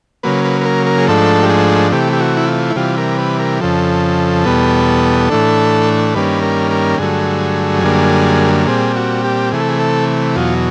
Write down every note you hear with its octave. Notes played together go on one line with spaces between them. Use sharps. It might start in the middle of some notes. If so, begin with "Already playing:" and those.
C#3 F#3 A#3 B4
B4
B4
A#4
A#4
G#4
G#2 F3 A3 D4 A4
G4
G#4
C3 E3 A3 G4
G4
F#4
E4
F4
E4
C3 E3 G3 F4
A#4
B4
A#4
F2 C#3 F3 A4
E2 B2 G3 B3
A2 E3 A3 D4
G2 D#3 G3 A#3 C#4 B4
A#4
A#4
G2 D3 F#3 A3 G#4
F#2 D3 G3 A#3
A#2 G3 C4 G#4
F#4
G4
C3 E3 A3 G#4
A4
G#4
A4
E2 B2 F#3 F4